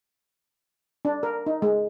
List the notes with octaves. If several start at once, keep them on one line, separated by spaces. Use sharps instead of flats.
D4
A#4
D#4
G#3